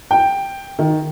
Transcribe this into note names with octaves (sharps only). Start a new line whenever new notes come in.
G5
D#3